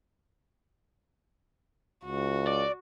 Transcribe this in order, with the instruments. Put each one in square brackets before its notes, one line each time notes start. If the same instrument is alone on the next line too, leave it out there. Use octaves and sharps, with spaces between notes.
[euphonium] C#2 [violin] F#4
[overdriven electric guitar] D5